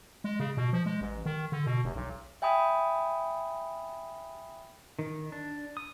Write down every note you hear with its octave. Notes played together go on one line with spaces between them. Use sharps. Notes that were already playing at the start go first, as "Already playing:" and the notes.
G#3
C#3
B2
F3
G#3
A1
D#3
D3
B2
F1
B1
E5 G5 G#5 B5 D#6
D#3
D4
D#6